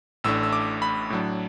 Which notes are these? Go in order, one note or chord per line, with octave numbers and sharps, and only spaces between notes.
A1 A2 A3 D4 E6
E6
D6
B5
A2 F#3 D4